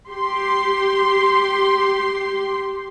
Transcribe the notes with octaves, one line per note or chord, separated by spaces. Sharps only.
G4 C6